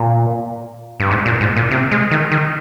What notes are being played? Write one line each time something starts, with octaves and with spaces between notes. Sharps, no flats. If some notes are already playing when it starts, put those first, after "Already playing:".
Already playing: A#2
G2
G#2
A#2
G#2
A#2
C3
G#3
D#3
D#3